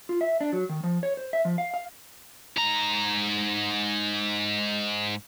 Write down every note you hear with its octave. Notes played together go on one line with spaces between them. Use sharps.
F4
E5
D4
F#3
D#3
F3
C#5
C5
E5
F3
F5
F5
G#2 A#5